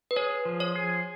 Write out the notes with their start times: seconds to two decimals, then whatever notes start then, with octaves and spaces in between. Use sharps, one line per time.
0.11 B4
0.16 G#4 C#5
0.45 F3
0.60 C#5
0.75 G#4